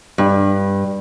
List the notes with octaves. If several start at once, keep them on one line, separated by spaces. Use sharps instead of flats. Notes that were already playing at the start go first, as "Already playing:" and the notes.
G2